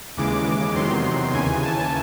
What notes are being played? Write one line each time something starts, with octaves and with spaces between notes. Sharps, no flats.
D#2 C#3 E3 G#3 D6
E2 C3 D#3 F#3 C6
D#2 C#3 E3 G#5
A5